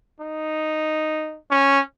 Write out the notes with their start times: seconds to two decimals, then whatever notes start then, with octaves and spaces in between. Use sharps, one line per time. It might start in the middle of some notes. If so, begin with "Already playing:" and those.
0.20 D#4
1.51 C#4